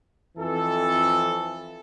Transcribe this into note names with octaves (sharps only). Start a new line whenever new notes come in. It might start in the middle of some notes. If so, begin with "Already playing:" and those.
F2 E3 A4